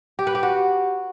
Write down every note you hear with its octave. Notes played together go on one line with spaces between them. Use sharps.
G4
B4
G4
F#4